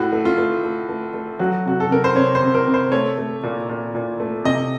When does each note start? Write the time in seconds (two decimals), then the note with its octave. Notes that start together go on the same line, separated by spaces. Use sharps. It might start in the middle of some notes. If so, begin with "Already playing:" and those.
Already playing: A2 F#4
0.12 A3
0.25 F4
0.38 A3
0.64 A3
0.89 A3
1.14 A3
1.39 F#3 F#4
1.66 C3 F#4
1.80 A4
1.90 C3 A#4
2.04 C5
2.15 C3 C#5
2.35 C5
2.42 C3
2.55 A#4
2.67 C3
2.74 C5
2.92 A3 C#5
3.18 A3
3.43 A#2
3.69 A#2
3.95 A#2
4.20 A3
4.44 C3 D#5